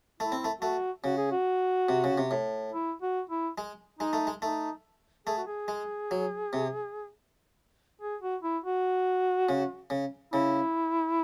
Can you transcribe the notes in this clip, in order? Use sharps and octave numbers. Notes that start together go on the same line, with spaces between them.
A3 E4
C4
A3
A3 F#4
C#3 F#4
G#4
F#4
C3
C#3
C3
A2
E4
F#4
E4
G#3
G#3 D#4
A3
G#3
A3 D#4
A3 G#4
F#4
G#4
G#3
F#3
C3
G#4
F#4
E4
F#4
C#3
C#3
C#3 E4